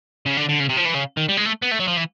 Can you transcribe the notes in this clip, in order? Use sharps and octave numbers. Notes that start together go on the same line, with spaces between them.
C#3
D3
D3
C#3
C3
F3
E3
C#3
D#3
G3
G#3
A3
B3
A3
F#3
F3
E3